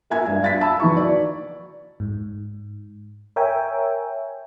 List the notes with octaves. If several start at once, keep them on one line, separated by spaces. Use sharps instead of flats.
A#3 A#4 E5 G#5 G#6
G2
F5 A6 B6
E5 A5 B5 E6
E3 D#4 C#6
F#4 D5
G#2
A#4 C#5 E5 G5 G#5